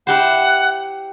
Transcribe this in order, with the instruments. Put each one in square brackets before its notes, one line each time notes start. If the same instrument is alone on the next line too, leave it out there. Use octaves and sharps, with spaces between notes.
[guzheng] E4 G4 C5 [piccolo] F#5